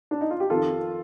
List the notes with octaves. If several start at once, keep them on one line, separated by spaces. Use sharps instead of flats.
D4
D#4
F4
G4
F2 D#3 F4 A4